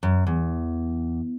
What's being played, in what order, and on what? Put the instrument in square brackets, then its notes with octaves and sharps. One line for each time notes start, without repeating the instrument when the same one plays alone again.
[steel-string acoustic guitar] F#2
E2